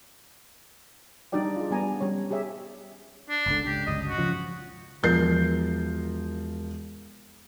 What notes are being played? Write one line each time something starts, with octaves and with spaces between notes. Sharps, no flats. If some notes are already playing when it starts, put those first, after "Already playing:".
G3 D4 D#4 F#4 D5 G5
F4 G#4
G3 B3 D4 G#5 A#5
G3 C#4 C#5
G4 G#4 C#5 E5
D4
G1 C#2 D3
C#2 G4
G1 C#2 D#5
F#4
C#3 F3
E1 F3 A#4 G6 C7